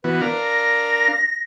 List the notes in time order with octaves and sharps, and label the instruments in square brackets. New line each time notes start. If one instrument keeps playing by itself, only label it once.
[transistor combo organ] E3 B3 F#4 [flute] B4
[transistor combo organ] D4 A#4 F5
[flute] A#6